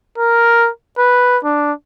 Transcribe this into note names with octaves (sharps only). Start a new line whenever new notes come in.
A#4
B4
D4